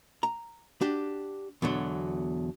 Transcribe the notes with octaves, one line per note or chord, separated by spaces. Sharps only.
A#5
D4 F#4 G4
E2 B2 D3 F#3